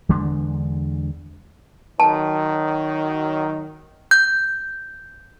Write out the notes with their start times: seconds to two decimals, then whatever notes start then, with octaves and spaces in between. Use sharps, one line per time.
0.09 E2 D3 G#3 D4
2.00 D#3 F#3 A5
4.11 G6